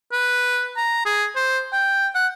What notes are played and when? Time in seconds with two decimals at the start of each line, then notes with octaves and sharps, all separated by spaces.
0.12 B4
0.77 A#5
1.05 G#4
1.36 C5
1.72 G5
2.15 F#5